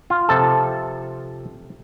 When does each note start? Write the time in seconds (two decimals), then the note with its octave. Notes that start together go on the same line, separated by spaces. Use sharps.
0.10 F4
0.29 C3 F3 A4